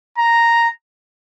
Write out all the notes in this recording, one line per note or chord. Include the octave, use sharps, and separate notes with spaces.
A#5